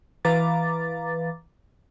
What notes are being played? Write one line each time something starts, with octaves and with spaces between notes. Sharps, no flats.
E3 B4 F5 A#5 D6 A6